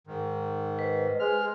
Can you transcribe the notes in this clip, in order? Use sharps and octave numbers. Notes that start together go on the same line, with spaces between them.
G#2 D#3
B4 C5 D#5
G#3 G#4 F6